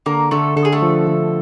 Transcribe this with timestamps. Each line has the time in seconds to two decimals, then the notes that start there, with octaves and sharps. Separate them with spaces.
0.06 D3 A#3 A#4
0.31 D3 A3 A4
0.56 D3 A4
0.65 G#4
0.72 A3 A4
0.82 F3
1.07 D3